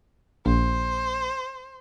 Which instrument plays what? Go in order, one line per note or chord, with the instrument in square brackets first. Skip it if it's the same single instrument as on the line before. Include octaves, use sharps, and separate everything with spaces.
[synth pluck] A#1 [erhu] C5